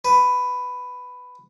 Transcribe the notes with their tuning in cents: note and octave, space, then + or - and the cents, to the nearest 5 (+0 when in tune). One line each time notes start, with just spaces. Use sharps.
B4 +10